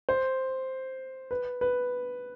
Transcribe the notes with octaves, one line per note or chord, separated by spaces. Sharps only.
C5
B4
B4